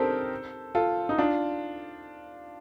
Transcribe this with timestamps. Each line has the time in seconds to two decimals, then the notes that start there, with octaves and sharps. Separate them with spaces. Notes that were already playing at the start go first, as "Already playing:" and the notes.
Already playing: C4 D4 D#4 G4 A4 A#4 C5
0.75 F4 A4
1.09 D#4
1.18 D4 F4